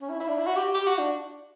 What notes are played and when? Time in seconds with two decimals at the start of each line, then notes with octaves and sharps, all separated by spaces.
0.02 C#4
0.10 E4
0.20 E4
0.28 D4
0.38 E4
0.47 F#4
0.56 G4
0.74 G4
0.87 F#4
0.98 D4